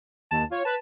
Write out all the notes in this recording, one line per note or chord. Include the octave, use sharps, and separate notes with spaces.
D#2 A5
F4 C#5
B4 A5